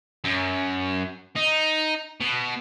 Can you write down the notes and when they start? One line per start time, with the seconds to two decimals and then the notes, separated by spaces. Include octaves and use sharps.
0.24 F#2
1.36 D#4
2.21 B2